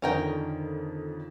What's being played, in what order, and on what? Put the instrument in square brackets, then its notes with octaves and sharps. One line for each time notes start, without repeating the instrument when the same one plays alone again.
[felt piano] F2 D3 D#3 [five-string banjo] C#4 A#4 G5